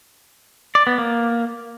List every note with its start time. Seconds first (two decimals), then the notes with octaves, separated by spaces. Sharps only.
0.75 D5
0.87 B3
0.98 A#3